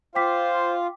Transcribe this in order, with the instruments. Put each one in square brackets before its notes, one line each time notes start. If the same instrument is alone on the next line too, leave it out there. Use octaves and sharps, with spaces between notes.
[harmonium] F4 F5 [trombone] C5 [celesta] G5 D6 B6